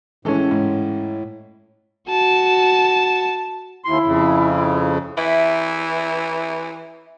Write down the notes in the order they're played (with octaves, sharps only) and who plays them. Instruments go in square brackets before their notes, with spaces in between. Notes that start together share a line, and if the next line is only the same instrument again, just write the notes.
[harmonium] A2 [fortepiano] E3 C#4 [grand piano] G#3 A4
[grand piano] G#2
[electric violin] F#4 A5
[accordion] D#2 C6 [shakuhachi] E4
[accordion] F2 C#3
[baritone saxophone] E3 [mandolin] E4